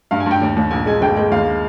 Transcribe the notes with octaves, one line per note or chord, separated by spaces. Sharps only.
G2 F5
G#5
G2
G5
D#2
D#2
A#1 G#5
G#3 G#5
G1 G5
G#3
D#2 F5